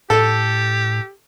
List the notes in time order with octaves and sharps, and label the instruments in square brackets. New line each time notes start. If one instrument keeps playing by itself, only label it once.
[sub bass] A2 [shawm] G4 [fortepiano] A4